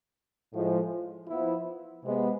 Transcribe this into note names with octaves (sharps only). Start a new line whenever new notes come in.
A2 F3 G#3
F3 B3 E4
C3 G#3 B3